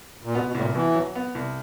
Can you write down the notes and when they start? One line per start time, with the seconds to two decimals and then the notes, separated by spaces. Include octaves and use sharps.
0.24 A#2
0.35 B2 B3
0.47 B2
0.54 C2 A2
0.61 A#2
0.75 B2 E3
0.95 F#3
1.15 B3
1.35 C2